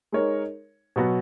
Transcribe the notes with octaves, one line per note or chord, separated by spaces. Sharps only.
G#3 D#4 A#4 C#5
B2 F#3 B3 F#4